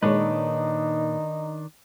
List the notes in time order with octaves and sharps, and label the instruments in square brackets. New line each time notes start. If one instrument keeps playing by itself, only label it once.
[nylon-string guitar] A#2 C#5 [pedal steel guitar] D#3 D4 B4 [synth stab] G#3 [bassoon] D#4